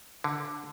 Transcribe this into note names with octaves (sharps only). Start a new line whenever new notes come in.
D3